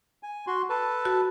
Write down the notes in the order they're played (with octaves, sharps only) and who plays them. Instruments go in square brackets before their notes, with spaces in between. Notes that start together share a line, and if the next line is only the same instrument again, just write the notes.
[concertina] G#5
F#4 C6
A4 B4 A5
[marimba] F#4